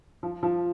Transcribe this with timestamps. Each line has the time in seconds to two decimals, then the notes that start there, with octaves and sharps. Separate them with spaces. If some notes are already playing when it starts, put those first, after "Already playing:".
0.23 F3
0.43 F3